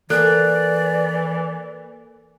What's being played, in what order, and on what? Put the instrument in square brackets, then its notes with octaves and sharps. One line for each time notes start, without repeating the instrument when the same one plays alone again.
[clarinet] E3 [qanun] A#3 [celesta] A4 F#6 [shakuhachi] D5